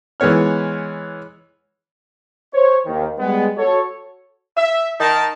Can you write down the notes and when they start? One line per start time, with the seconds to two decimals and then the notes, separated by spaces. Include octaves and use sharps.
0.20 E3 G#3 B3 C#5 F6
2.53 C5 C#5
2.86 D#2 D#3
3.19 G3 G#3 B3
3.56 F#4 A4 C#5
4.57 E5
5.00 D#3 D#4 A#4 D#5 A5